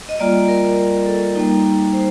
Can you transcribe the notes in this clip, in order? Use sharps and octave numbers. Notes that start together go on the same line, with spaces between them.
D#5
G3 A#3 F4 D5
A#4
A4
G3 A#3 D#4
C5